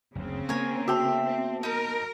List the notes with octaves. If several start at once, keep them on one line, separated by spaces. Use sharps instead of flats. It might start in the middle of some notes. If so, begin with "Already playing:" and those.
F#1 D2 C#3 C4
A#3 B3 A#4 C#5 G#5
F#4 E5 G5 A5
C4
D#4 A#4 B4